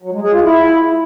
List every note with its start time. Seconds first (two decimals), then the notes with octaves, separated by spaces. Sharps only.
0.02 F#3
0.12 G#3
0.23 G#4
0.33 F4
0.43 E4